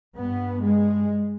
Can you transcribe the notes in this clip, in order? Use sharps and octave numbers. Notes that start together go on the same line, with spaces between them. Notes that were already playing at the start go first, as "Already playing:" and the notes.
G2 B3
G#3